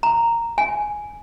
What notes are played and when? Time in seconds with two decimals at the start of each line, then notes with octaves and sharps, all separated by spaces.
0.03 A#5
0.58 G#5